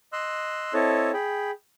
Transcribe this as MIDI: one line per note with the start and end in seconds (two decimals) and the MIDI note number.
0.13 0.73 75
0.13 0.73 84
0.13 0.73 88
0.13 0.73 90
0.74 1.11 60
0.74 1.11 64
0.74 1.11 69
0.74 1.11 73
0.74 1.11 75
0.74 1.11 81
1.14 1.51 68
1.14 1.51 79
1.14 1.51 83